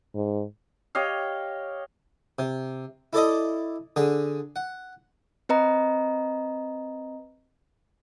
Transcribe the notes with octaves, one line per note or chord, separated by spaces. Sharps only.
G#2
G4 C#5 D#5 F5
C3
E4 A4 D5 D#5
D3 G#4
F#5
C4 B4 D#5 A#5